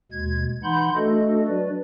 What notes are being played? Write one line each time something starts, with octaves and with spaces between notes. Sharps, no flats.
D#2 B2 G#3 G#6
E3 D#4 F#5 B5 C6 G6
A3 D4 F#4 A4 D#5
F#3 D4 F#4 B4 D5